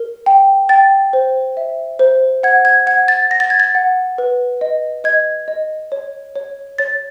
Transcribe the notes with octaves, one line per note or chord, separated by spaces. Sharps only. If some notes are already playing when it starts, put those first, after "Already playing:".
Already playing: A#4
G5
G5 A6
C5
E5
C5
F#5 G#6
G#6
F#5 G#6
A6
F#5 A#6
A6
G#6
A6
F#5
B4
D#5
D#5 G#6
D#5
C#5
C#5
C#5 A6